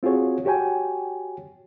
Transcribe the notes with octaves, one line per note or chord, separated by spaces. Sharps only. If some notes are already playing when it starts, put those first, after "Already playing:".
C4 F4 F#4 G#4 C#5
F#4 G4 C#5 G5 G#5